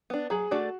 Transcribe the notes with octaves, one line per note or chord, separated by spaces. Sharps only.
B3 D4
F#3 G#4
A3 D4 F#4 A4 D5